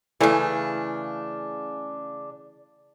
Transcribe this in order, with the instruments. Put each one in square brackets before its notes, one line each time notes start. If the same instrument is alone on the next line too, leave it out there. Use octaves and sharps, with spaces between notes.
[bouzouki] C#3 D4 [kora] E3 A3